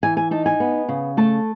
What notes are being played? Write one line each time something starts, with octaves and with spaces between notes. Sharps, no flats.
E3 G#5
G#5
D#4 A5
G#5
B3
C#3
A3 A5